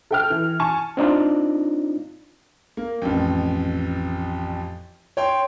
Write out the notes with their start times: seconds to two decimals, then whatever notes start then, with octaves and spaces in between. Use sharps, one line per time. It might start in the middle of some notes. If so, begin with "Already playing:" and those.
0.11 A4 G5 F6
0.30 E3
0.60 G#5 A5 C#6
0.97 C4 D4 D#4 F4
2.77 A#3
3.02 A1 F2
5.17 C#5 G5 C6